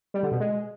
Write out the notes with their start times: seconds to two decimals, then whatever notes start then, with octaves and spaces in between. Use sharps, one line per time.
0.14 G3
0.23 D3
0.32 B2
0.40 G#3